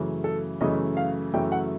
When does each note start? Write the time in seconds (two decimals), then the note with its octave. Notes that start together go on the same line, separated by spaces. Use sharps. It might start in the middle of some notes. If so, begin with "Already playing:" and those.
Already playing: F#2 C#3 E3 A3
0.24 A4
0.61 F#2 C#3 E3 A3 D#5
0.97 F5
1.34 F#2 C#3 E3 A3 G5
1.52 F#5